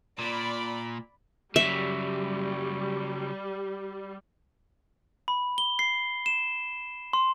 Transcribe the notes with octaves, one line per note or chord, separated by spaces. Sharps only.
A#2 D5 B5
C#3 F#3 G3 E5
B5
G7
C7
E7
C6